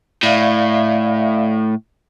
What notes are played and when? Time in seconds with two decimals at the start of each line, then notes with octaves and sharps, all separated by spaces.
0.23 A2 D5 E5 F5